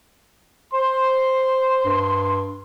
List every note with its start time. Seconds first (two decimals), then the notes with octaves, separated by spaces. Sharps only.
0.73 C5 C6
1.85 G2